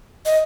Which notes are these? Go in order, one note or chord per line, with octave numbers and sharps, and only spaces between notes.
D#5